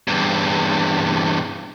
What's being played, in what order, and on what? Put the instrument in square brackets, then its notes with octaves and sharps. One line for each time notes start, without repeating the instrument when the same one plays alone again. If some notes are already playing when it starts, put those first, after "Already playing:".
[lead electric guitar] E2 G2